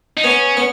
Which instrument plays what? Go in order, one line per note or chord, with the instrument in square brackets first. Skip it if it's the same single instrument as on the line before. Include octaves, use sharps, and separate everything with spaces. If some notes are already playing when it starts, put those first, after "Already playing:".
[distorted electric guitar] D#4
[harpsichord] B3 [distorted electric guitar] C#4
[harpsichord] B3